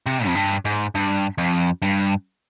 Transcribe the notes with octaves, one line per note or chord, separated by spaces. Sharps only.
C3
F2
G2
G#2
G2
F2
G2